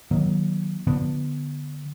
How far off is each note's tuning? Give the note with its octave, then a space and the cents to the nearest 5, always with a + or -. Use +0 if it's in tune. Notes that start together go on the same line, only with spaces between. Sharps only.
D#3 +0 F#3 +0 A#3 +30
D3 +0 F3 +25 B3 -10